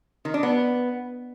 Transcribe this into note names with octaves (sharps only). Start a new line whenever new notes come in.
D#3
D4
B3